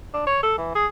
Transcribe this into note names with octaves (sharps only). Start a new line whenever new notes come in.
D4
C#5
A4
E3
G#4